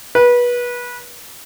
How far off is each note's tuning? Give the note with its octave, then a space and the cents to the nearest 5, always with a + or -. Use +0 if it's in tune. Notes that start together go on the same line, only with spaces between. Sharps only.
B4 -25